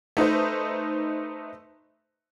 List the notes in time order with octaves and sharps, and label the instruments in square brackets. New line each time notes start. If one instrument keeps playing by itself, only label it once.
[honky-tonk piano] A3 D#4 B4 C5